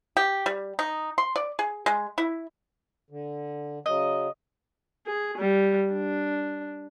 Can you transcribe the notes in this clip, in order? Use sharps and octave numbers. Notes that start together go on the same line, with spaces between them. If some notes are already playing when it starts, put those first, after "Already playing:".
G4
G3
D#4
C6
D5
G#4
G#3
E4
D3
C#3 F#3 D#5
G#4
G3
D4